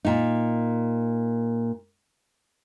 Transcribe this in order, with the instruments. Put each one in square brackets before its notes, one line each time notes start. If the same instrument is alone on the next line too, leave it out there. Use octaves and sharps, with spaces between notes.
[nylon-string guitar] A#2 D#4